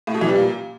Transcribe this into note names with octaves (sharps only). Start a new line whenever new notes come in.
A2
B2
E3
G3
A#2